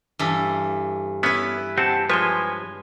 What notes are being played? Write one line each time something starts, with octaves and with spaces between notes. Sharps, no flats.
G2 E3 A4
B3 C#4 E4 B4
C4 G4 F#5 A5
F3 G#3 B4 C#5 G#5 C6